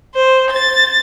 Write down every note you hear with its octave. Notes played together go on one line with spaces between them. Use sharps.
C5
A6